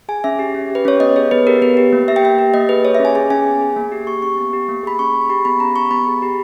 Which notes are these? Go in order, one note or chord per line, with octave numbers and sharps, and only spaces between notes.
G#4 G#5
C#4 E5
G4
C#4
G4
B4
C#4 C#5
B3 D#5
G#4 C#5
B3 B4
G4 A#4
B3 B4
G4
A#3
G4 E5
G5
A#3 E5
G4
A#3 D#5
G#4 B4
G#4 C#5
E5
C#4
G#5
G#4 G#5
C#4 G#5
B3
G#4
A#3
G4
G4 C#6
C#4 C#6
B3
G4
A#3
G#4 B5
C#4 C#6
G#4
C#6
G4 B5
B3 B5
C#4 A#5
G4 C#6
B3 B5
G#4
G4